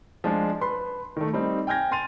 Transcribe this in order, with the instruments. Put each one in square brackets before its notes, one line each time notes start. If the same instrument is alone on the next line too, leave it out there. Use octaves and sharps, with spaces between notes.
[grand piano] F3 G#3 D4
B4 B5 C6
D#3 A3
G3 C4 D#4
G5 G#5 F6 G6 G#6 A#6
G#5 C6 A6 D#7 F7